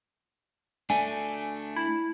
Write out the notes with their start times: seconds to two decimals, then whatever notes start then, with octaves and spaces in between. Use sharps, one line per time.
0.90 A3 D4 G#5
1.76 E4